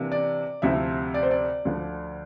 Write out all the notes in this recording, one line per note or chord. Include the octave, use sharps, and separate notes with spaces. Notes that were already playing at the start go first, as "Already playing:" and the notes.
Already playing: C3 E3 A#3 D4 F4
D5
D2 C3 F3 C4 E4 E5
D5
C5
D5
D2 D3 F3